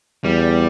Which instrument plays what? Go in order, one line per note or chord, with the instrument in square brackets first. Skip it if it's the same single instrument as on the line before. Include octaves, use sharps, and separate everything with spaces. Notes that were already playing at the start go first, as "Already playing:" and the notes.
[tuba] E2 [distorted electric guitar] G3